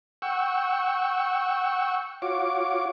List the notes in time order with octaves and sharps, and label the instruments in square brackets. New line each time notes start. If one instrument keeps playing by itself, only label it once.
[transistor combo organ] F#5 G5 C#6 E6
F4 F#4 C#5 D6